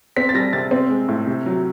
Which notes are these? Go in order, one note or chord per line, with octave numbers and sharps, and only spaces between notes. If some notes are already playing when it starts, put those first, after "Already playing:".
C4 B6
A6
G3 A#6
C3 A6
C4
G#3
A2
C3
F#3